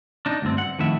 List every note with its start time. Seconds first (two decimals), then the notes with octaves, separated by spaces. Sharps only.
0.26 D4 D#4
0.42 D2 G2 C4
0.58 F#5
0.79 F2 A2 D#3 E5